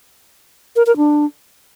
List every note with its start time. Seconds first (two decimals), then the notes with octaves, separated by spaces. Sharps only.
0.76 A#4
0.86 A#4
0.97 D4